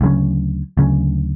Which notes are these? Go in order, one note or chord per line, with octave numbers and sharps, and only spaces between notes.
D2 C#3 F#3 C#4
D2 C#3 F#3 C#4